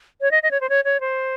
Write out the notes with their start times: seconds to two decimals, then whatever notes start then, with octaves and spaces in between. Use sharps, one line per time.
0.21 C#5
0.31 D#5
0.43 D#5
0.51 C#5
0.61 C5
0.69 C#5
0.84 C#5
1.00 C5